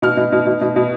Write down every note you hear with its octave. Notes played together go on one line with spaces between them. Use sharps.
B2 F6
B2
B2
B2
B2
B2